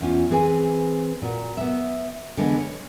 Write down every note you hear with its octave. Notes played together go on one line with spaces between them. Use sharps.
E2 C#4 F4
E3 C4 G#4 B4 G#5
A#2 F#4
B3 E5
D3 E3 G#3 B3
C#5